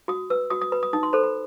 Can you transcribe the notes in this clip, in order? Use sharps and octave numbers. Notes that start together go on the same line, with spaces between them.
F#4 D#6
B4 E6
F#4 D#6
D#6
B4 B5
D#6
D#4 D#6
C6
A4 C5 B5
B5